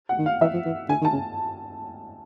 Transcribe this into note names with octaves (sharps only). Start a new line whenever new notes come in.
F#5
D#3
F5
E3 E5
F3
E3
D3 G#5
D#3
A5
C#3